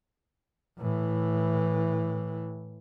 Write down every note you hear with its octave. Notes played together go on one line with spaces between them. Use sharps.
A2 E3